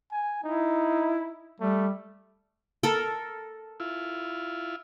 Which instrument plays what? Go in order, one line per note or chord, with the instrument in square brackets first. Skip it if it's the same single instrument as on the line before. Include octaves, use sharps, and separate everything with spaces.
[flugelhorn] G#5
[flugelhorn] D#4 [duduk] E4
[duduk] G3 [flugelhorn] A3
[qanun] A4 A#4
[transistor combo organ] E4 F4